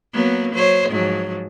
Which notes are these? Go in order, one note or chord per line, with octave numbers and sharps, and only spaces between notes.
F#3 A#3 B3
F#3 C5 C#5
G#2 F3 F#3